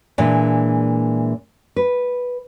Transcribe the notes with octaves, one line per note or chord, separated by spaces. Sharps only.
A#2 E3 G#3 D4
B4